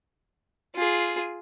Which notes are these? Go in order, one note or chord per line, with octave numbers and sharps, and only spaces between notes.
F4 G#4